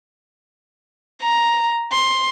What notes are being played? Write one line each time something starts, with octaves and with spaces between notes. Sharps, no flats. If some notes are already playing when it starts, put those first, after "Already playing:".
A#5
C6